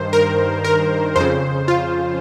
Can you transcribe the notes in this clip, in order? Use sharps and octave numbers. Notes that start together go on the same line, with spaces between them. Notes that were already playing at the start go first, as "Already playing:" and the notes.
Already playing: G2 D#3 C5
A#4
A#4
F2 C#3 C5
F4